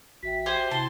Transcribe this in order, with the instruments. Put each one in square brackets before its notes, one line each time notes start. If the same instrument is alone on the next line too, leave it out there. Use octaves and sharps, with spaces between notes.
[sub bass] A1 [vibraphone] F#4 E5 G5 [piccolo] B6
[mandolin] G4 C5 G#5 [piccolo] G7
[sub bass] C3 [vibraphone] E4 [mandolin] A5 C6